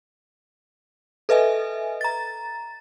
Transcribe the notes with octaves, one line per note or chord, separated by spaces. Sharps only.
A4 B4 D#5 E5 G#5
A#5 A6